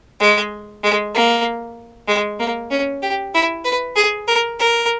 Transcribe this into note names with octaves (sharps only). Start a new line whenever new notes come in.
G#3
G#3
A#3
G#3
A#3
C#4
G4
E4
B4
G#4
A#4
A#4